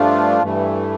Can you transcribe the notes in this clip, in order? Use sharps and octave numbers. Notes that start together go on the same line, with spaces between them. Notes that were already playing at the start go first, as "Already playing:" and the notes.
Already playing: G2 F3 A3 D4 F4
G2 E3 A3